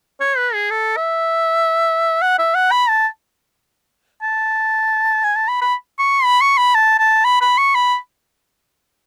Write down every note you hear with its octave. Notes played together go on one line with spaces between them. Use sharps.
C#5
B4
G#4
A4
E5
F#5
E5
F#5
B5
A5
A5
G#5
A5
B5
B5
C#6
B5
C#6
B5
A5
A5
B5
B5
C#6
B5